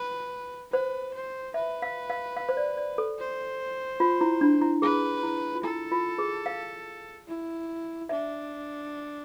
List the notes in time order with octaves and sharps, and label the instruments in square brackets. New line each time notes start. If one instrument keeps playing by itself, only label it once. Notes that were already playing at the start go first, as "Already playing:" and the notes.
Already playing: [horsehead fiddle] B4
[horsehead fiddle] B4 [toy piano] C5
[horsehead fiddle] C5
[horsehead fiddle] B4 [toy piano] E5
[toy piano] F5
F5
F5
C5
D5
D5
A4
[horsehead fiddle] C5
[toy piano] F4
E4
D4
E4
[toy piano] G#4 [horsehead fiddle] B4
[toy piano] E4
F4
[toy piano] E4 [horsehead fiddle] A4
[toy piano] F4
G#4
F5
[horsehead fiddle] E4
[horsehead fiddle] D4 [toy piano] E5